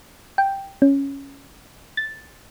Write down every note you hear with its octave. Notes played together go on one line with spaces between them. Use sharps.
G5
C#4
A6